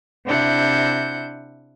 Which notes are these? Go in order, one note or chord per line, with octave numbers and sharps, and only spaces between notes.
C3 D4 E4 F#5 G6